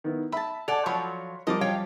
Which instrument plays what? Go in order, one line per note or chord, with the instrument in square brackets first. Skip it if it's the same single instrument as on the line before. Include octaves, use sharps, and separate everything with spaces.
[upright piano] D#3 B3 E4
[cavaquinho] E5 A5 [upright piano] B5
[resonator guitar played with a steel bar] A4 D5 [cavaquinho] F#5 G#5 [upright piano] F7
[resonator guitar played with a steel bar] F3 F#3 F4 [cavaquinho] C#5 [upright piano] B5 C#6
[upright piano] F#2 F3 G3 [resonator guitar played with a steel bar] A#4 [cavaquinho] D#5 A5 D6
[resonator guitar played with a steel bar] C#5 F5 G5